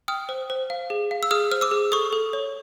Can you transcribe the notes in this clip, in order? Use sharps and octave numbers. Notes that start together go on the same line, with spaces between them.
G5 D#6 F6
C5
C5
F5
G#4
F5
E6
G#4 D#6 F6
C5 F6
D6 E6
G#4
A4 C#6 D#6
A4
C#5